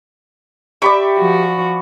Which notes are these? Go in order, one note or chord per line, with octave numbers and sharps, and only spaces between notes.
G4 D5 E5 B5 C#6
F3 F#4